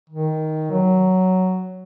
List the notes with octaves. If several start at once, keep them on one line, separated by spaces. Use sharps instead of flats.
D#3
F#3